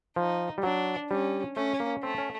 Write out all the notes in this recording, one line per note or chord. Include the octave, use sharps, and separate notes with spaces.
F3 D#4
G3
F#3 D4
G3 C#4
A3 C#4
A#3
A3 C4
C#4